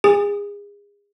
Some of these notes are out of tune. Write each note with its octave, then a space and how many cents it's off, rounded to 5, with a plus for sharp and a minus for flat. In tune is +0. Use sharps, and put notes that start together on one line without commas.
G#4 -30 D#6 +0